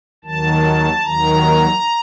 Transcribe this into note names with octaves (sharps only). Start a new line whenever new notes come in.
D#2 D#3 F#3 A5
D#2 D#3 F#3 A#5